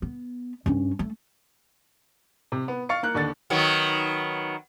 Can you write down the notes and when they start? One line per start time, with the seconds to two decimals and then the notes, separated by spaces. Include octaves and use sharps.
0.02 B3
0.66 G2 C#4
0.99 A3
2.52 C3
2.68 B3
2.89 F5 C#6 A6 C#7
3.03 A#3 F#6
3.15 D#2 D3 A6
3.50 D#3 F#3 B3